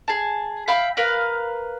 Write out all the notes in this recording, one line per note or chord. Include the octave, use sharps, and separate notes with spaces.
G#4 A5
E5 F5 G5 B5
A#4 B4 F5